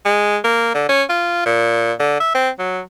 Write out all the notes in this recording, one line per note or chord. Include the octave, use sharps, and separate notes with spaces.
G#3
A#3
D3
C#4
F4
A#2
D3
E5
C4
F#3